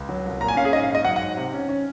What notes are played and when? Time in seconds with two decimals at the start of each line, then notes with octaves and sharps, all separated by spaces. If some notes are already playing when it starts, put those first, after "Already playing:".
Already playing: C#2
0.09 F#3
0.26 C2
0.40 A#2 A#5
0.48 G#5
0.56 C#4 F5
0.65 G#4
0.73 G#2 D#5
0.84 F5
0.90 G#2
0.95 D#5
1.05 F#3 F#5
1.16 F#5
1.21 G#2
1.37 C3
1.54 C#4
1.69 C#4